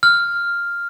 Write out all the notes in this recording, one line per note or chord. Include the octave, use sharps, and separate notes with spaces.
F6